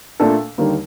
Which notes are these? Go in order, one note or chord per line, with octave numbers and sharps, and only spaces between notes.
A#2 A3 D4 A4
D#2 D3 G3 A#3 D#4